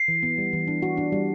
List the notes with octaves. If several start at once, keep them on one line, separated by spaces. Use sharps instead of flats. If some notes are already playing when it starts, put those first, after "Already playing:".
Already playing: C7
E3
B3
G3
E3
D4
F#4
D4
G3